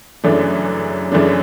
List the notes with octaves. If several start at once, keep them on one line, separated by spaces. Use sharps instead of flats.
F#2 C#3 E3 A3 D4
F#2 C#3 E3 A3 D4